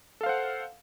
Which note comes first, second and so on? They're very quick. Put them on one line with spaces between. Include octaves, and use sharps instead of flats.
A4 F5 C5 F#5